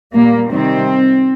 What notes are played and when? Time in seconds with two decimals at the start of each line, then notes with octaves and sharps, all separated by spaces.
0.14 A#2 G3 A#3
0.50 C3 D#3 G3 C4